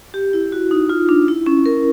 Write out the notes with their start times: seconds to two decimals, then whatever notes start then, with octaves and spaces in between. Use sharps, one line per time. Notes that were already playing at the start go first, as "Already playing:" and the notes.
0.14 G4
0.33 E4
0.52 F#4
0.71 D#4
0.89 F4
1.09 D4
1.28 E4
1.46 C#4
1.66 A#4